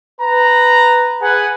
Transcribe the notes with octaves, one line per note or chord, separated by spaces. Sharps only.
B4 A#5
G#4 B4 F#5 G#5